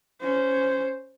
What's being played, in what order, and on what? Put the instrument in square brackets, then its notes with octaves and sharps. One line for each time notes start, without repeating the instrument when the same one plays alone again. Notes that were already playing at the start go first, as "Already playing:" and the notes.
[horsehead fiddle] C#4 C5